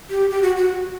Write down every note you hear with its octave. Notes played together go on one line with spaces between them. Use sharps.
G4
G4
F#4
F#4